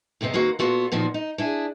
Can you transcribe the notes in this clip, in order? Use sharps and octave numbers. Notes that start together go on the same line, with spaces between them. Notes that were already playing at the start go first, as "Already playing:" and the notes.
F#2 C3 B3 C4 D#5
D#2 A#3 C4 F#4 B4
A#2 A#3 B3 F4 F#4 A4
A#2 D#3 F3 B3 F#4
D#4
D4 E4 G#4